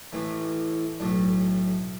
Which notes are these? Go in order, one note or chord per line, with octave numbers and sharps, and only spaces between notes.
A1 A2 E3 A3
B1 A2 A3 D4